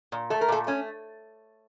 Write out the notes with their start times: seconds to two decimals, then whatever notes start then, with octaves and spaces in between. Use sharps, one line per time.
0.12 A#2
0.30 A3 A4
0.41 A#4
0.48 A#2 A3 A4
0.67 A3 C#4